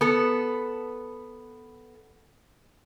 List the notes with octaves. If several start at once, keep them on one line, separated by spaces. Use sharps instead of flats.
B3 A4